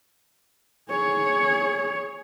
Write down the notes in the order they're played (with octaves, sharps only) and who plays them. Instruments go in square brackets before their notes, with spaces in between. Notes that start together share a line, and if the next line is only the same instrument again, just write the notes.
[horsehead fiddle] G#4 C#5